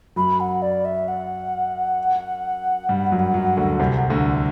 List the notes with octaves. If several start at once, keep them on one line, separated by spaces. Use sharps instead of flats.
F#2 F#3 B5
F#5
D5
E5
F#5
G2 G3
F#2 F#3
F#2 F#3
D2 D3
C2 C3
D2 D3